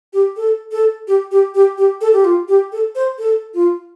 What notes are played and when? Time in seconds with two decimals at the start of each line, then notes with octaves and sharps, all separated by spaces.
0.13 G4
0.37 A4
0.72 A4
1.07 G4
1.31 G4
1.55 G4
1.78 G4
2.01 A4
2.13 G4
2.24 F4
2.48 G4
2.72 A4
2.95 C5
3.18 A4
3.54 F4